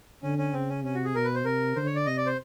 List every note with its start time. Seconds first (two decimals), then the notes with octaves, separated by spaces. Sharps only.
0.23 D3 C#4
0.38 C#4
0.53 C#3 C4
0.69 C#4
0.84 C3 C#4
0.94 F#4
1.05 G#4
1.15 B2 A#4
1.25 B4
1.34 C5
1.45 C3 A#4
1.76 D3 C5
1.86 C#5
1.96 D5
2.06 C3 D#5
2.17 D5
2.26 C5